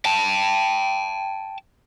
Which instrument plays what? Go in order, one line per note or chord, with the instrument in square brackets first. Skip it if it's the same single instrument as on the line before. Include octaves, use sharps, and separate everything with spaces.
[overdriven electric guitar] G5 A5